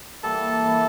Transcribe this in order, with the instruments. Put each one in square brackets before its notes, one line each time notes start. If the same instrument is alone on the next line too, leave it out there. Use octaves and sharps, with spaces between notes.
[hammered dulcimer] E3 G3 A#3 [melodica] A4 A5
[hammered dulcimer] E3 G3 A#3